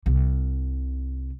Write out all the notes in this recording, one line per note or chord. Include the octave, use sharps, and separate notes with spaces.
C2 C3